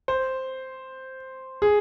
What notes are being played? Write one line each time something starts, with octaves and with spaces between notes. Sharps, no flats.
C5
G#4